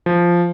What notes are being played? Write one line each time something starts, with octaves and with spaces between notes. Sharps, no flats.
F3